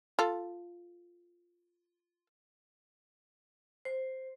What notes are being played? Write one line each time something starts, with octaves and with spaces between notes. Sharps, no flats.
F4 A4
C5